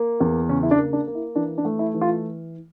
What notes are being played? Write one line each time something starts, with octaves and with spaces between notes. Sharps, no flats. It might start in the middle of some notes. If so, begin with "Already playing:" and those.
Already playing: A#3
E2
C#3 C#4
E4
D4
A#3
D4
A#3
E4
E3 D4
D4
A3
E4
E3
F4